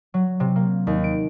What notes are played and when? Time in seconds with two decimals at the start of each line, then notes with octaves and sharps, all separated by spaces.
0.14 F#3
0.40 C3
0.56 A#3
0.87 D#2
1.04 D7